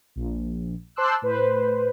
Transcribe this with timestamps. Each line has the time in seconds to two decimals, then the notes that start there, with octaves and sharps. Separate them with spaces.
0.16 A#1
0.96 C5 A5 C6 D6 E6 F#6
1.22 A2 B4 C5